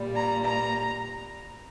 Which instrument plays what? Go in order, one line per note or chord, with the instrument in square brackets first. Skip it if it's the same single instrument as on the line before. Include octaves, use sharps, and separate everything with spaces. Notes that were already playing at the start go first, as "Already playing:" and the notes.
Already playing: [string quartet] A#2 G3
A#5
A#5